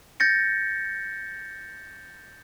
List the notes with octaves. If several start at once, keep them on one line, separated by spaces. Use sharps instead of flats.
G6 A6 A#6 C#7